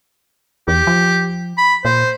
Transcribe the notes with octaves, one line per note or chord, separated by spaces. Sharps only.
E2 G4
F3
B5
A#2 C5